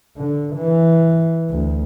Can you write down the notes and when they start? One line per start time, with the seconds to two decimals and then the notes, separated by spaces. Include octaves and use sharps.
0.18 D3
0.57 E3
1.50 D2